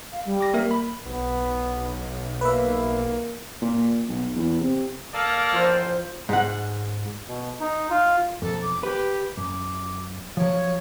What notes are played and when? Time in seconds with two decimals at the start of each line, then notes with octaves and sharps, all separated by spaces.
0.12 F5
0.26 G3
0.40 D6 A#6
0.54 A#3 A#4 E5
0.71 B5
1.05 B1 B3
2.41 A#3 B4 E5
3.61 A#2
4.08 B1
4.36 E2
4.60 C3
5.14 A#3 A4 D5 F5 A5
5.53 A1 F3 C5
6.29 G#2 F#5
7.28 B2
7.60 D#4
7.90 F4
8.42 B1 F2 A4
8.62 D6
8.83 G4 B4
9.37 F#2 D6
10.37 F3 F#3 C#5